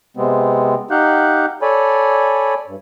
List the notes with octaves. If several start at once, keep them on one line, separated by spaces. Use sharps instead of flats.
C3 G#3 B3 C4
D#4 G4 F5 F#5 F#6 G6
A4 C#5 D5 G#5 B5
G2